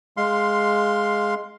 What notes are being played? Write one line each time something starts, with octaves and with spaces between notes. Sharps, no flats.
G#3 F5 C6